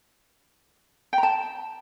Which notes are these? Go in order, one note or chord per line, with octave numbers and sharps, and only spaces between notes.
G5
A#5
A5